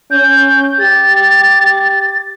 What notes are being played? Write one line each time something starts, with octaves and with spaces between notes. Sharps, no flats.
C#4 G6
G4 A6